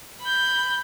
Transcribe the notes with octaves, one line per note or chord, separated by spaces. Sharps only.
B5 G6